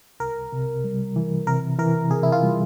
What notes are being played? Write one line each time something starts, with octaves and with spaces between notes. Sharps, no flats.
C2 A#4
C3
G3
E3
C3 A#4
E3 A#4
C3 G#4
E4
F4
G3